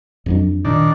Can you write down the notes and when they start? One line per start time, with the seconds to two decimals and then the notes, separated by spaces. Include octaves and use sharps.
0.26 F2 F#3 D4
0.65 A#2 D#3 D4